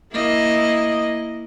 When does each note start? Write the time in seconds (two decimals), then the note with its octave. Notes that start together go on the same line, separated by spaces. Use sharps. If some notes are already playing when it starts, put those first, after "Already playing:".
0.13 A#3 E4 D#5